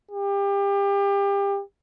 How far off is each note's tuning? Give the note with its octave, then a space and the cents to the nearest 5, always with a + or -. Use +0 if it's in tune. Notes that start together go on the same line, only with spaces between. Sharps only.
G4 +30